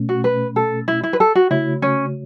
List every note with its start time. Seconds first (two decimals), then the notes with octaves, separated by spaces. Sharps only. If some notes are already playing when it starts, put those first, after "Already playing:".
Already playing: B2 A3 C#4
0.09 F#4
0.24 B4
0.56 A4
0.88 E4
1.03 E4
1.13 B4
1.20 A4
1.35 F#4
1.51 C#3 A3 E4 F#4 C#5
1.82 C#4